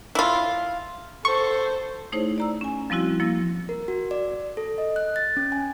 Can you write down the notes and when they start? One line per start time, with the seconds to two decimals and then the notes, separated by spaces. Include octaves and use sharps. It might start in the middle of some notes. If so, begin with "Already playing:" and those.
0.15 E4 F4
1.25 A4 C5 C#6
2.12 A3 D#4 E4 G#4 C5 C#5
2.38 D5 A#5 E6
2.61 C#4 G#5
2.90 F3 G3 C4 E4 F#4
3.19 F3 A#3 E4 E6 A#6
3.69 A#4
3.88 F#4
4.11 D5
4.57 A4
4.78 D#5
4.96 F#6
5.16 A6
5.37 C#4
5.52 G#5